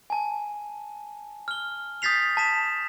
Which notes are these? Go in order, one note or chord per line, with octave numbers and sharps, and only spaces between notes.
G#5 A5
F6 G7
D#6 G6 A6 B6 C7 F7
A5 B6 E7